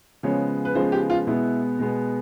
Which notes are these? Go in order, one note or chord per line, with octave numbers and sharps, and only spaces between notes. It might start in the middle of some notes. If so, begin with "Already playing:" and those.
C#3 F3 G#3 B3 C#5
B4
C#3 F3 G#3 B3 C5
G4
F4
B2 G#3 B3 E4
B2 G#3 B3